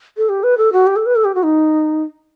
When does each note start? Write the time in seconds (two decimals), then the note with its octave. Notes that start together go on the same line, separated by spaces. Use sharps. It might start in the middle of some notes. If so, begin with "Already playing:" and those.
0.18 A4
0.29 G4
0.43 B4
0.58 A4
0.73 F#4
0.87 G4
0.96 A4
1.06 B4
1.16 A4
1.25 G4
1.35 F#4
1.43 D#4